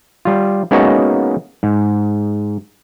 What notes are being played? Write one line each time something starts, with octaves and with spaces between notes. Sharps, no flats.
G3 F4
G#3 A#3 B3 C#4 D#4 F#4
G#2